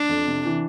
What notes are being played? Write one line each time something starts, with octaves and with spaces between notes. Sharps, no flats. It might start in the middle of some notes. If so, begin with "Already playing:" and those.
Already playing: D4
F2
C3
E3